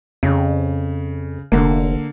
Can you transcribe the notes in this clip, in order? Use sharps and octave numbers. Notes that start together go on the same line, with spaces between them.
F2 C#3
F1 D3 A#3